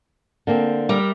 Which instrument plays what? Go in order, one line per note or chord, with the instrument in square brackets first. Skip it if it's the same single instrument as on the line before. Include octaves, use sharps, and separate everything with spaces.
[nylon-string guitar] D3 A#3 C4
[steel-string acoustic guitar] G3 A#4 E5